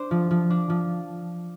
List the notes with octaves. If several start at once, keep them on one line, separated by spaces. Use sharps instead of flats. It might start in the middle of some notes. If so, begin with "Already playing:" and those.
Already playing: D4 C5
F3
F3
D4
F3